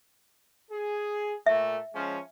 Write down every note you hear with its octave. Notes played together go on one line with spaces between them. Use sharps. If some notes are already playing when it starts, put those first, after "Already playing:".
G#4
A#2 A3 E5
F3 G#3 C#4